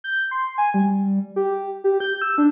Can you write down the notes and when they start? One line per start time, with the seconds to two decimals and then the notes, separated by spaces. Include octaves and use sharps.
0.04 G6
0.31 C6
0.58 G#5
0.74 G3
1.36 G4
1.84 G4
2.00 G6
2.22 E6
2.38 D4